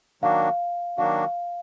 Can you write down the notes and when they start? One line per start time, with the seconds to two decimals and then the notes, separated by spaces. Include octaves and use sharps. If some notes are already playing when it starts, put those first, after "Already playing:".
0.22 D#3 F#3 A#3 D4 F#4 F5
0.98 D#3 F#3 A#3 D4 F#4 F5